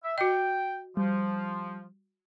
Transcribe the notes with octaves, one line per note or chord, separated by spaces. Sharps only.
E5
F#4 D#5 G5
F3 G3